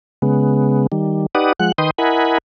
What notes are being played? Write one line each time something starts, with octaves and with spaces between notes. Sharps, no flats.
C#3 G#3 B3
D#3 G3
D#4 G4 B4 D5 F#5 D#6
F3 G#3 F#5 F#6
D#3 B4 D#5 G5 C6 D#6
E4 A#4 D#5 F#5 G#5 B5